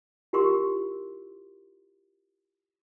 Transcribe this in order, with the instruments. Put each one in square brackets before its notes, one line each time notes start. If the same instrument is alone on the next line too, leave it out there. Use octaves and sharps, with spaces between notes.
[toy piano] E4 F4 G4 A#4 C6 C#6